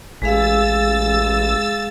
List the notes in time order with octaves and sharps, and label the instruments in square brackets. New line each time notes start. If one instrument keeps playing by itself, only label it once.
[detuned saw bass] A1 [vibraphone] G#3 G#4 F5 [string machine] E6 A6